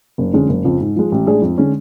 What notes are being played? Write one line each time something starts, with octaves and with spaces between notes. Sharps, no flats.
F#1
F2 D3 G#3 C#4
F#1
F2 C#3 F3
G#2
F3 G#3
A1
A2 G#3 D4 G#4
F2
D3 G#3 C#4